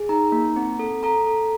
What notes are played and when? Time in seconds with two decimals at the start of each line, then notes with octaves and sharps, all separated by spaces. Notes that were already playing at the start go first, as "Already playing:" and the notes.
Already playing: G#4
0.09 D#4 A#5
0.32 A#3
0.56 C4
0.79 A4
1.03 A4 A#5
1.27 A4